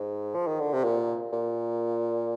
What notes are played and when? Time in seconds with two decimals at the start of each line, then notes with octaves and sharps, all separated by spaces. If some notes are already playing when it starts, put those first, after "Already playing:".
Already playing: G#2
0.35 F3
0.47 D#3
0.60 D3
0.73 C3
0.84 A#2
1.33 A#2